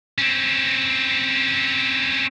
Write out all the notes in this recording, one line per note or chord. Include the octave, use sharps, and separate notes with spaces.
C4 C#4